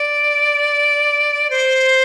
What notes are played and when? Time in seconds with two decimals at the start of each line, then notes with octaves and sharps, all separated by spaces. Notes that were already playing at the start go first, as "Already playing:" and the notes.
Already playing: D5
1.50 C5